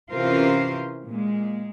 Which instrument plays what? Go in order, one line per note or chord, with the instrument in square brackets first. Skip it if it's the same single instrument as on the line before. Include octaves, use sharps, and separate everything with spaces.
[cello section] C3 E3 C#4 F4 A#4 C5
A#2 G#3